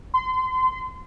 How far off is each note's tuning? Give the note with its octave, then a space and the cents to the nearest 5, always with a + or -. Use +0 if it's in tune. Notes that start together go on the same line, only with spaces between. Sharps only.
C6 -30